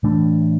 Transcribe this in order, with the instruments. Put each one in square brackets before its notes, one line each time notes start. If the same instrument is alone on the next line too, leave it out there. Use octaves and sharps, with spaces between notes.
[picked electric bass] A2 E3 A3 D4